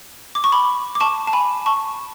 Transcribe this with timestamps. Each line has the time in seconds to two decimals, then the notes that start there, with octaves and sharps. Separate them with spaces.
0.35 D6
0.44 C#6
0.52 B5 D6
0.95 D6
1.00 A5 C#6
1.27 A5
1.33 G#5 B5
1.66 A5 C#6